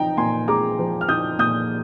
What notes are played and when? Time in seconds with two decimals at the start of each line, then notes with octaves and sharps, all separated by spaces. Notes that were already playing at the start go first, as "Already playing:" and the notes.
Already playing: F3 D#4 G5 A#5
0.17 A#2 G#5 C6
0.48 G#3 A#5 D6
0.79 F3
1.01 F6
1.09 D#4 D#6 G6
1.39 A#2 D#6 G6